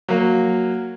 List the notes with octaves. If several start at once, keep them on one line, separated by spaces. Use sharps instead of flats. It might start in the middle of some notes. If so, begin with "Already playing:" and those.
F#3 A#3